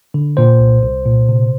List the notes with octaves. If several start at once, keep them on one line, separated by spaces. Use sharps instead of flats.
D3
A#2 C5
C2
C2
A#2
C3